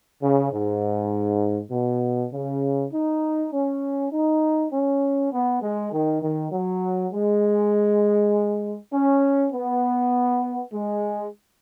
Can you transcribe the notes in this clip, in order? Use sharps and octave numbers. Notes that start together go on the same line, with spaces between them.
C#3
G#2
B2
C#3
D#4
C#4
D#4
C#4
B3
G#3
D#3
D#3
F#3
G#3
C#4
B3
G#3